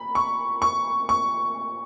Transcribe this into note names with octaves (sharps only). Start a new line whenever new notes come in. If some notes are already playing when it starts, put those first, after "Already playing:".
Already playing: A#5 B5
C#6
C#6
C#6